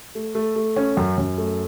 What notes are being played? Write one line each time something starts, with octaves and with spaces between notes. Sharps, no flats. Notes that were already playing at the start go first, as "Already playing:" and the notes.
A3
A3
A3
C#4
F#2
F#2
A3